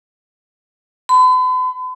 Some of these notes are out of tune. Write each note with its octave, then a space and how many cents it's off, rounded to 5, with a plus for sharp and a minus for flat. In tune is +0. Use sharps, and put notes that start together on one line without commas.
B5 +45